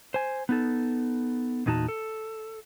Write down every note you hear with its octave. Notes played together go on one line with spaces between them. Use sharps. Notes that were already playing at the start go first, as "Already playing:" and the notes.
C5 G#5
B3 D#4 A4
E2 A#2 D#4 F#4 A5
A4